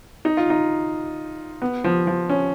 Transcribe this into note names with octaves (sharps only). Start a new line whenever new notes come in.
D#4
F4
D#4
B3
F3
F3
C#4